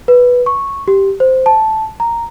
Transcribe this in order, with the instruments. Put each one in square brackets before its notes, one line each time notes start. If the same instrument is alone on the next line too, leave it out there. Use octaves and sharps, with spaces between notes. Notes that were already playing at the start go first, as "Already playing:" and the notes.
[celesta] B4
C#6
G4
C5
A5
A#5